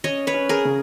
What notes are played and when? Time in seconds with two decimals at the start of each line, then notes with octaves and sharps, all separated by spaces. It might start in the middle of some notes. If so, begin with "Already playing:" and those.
0.04 C#4 C#5 D#5
0.27 B4 C#5
0.34 C#4
0.49 G#4 A#4
0.65 C#3